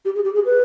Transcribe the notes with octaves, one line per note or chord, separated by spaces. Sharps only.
G4
G#4
G4
G#4
B4